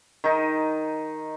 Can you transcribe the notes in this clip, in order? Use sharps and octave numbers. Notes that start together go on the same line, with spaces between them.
D#3 D#4